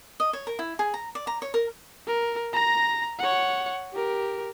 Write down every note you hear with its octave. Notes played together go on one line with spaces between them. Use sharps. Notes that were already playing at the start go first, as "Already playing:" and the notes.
D#5
C#5
A#4
E4
G#4
A#5
D5
A#5
C#5
A#4
A#4
A#5 A#6
C#5 F#5
G4 A#4